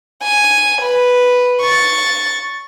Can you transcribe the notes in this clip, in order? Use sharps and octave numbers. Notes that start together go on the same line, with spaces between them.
G#5
B4
C#6 A6